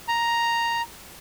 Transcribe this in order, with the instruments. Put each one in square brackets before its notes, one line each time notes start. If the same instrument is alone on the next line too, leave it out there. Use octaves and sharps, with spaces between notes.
[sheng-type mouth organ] A#5